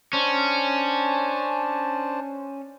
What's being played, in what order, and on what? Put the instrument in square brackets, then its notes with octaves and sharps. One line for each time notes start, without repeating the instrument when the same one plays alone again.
[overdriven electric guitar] C#4 [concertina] D4 C5 A5